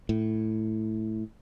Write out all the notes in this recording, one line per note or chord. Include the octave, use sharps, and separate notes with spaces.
A2